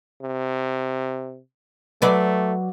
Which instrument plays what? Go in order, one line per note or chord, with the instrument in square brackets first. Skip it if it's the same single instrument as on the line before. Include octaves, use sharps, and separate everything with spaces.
[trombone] C3
[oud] F#3 B4 D5 [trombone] A3